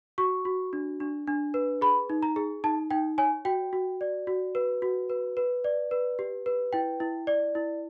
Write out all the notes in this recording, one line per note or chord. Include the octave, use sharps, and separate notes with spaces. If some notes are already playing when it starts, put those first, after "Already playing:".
F#4 C#6
F#4
D4
D4
D4
B4
G#4 B5
D#4
A#5
G#4
D#4 A5
D#4 G5
C#5 G#5
F#4 G5
F#4
D5
F#4
B4
F#4
B4
B4
D5
B4
G4
B4
E4 G5
E4
D5
E4